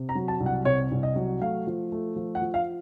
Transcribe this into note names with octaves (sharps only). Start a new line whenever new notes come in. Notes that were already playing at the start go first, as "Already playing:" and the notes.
Already playing: C3
A#5
F#3
A5
C2
F#5
C3 C#5
C2
D#5
F#3
A3 F5
F3
A3
F3
F#5
F3
F5